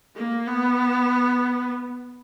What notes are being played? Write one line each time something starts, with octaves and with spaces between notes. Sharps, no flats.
A#3
B3